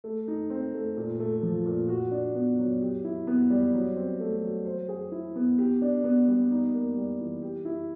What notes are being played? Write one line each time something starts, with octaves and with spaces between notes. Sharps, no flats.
A3
D#4
C4
A3
A#2
A3
F3
A#2
F#4
D4
B3
F#3
G4
E4
B3
G3
F#3
C4
A3
F#3
C5
G#4
E4
B3
G4
D4
B3
G3
D#4
A#3
G3
E3
G4
E4